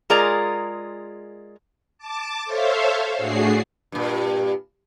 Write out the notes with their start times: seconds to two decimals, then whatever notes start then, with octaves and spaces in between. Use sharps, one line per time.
0.10 G#3 F4 G#4 A#4 D5 A#5
1.98 A5 D6
2.45 A4 C5 C#5 E5 F5
3.17 A2 A3 D4 F#4 G#4 C7
3.92 G2 A#2